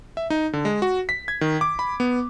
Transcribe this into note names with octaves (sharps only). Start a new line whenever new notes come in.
E5
D#4
D3
G#3
F#4
B6
G#6
D#3
D6
B5
B3